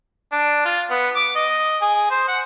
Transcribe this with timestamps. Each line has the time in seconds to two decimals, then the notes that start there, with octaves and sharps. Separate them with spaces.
0.32 D4
0.65 F4
0.90 B3
1.16 D6
1.36 D#5
1.82 G#4
2.11 C5
2.28 F#5